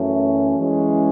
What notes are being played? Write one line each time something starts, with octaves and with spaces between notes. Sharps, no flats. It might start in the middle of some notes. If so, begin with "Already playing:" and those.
Already playing: F#2 E3 A3 C#4
E3 G#3 C#4